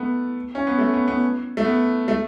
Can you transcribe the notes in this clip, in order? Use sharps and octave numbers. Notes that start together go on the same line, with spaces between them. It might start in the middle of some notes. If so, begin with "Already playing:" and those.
Already playing: A3 B3
C#4
B3
A3
B3
B3
A3
B3
A3